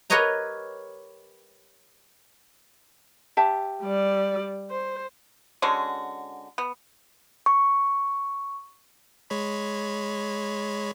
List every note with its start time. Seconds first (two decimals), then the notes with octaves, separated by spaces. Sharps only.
0.10 G4 A#4 B4 C#5 D#5 A#5
3.37 G4 E5 A5
3.83 G3 D5
4.71 C5
5.62 D3 G#3 C#4 F#4
6.58 B3
7.46 C#6
9.30 G#3 C#5 B5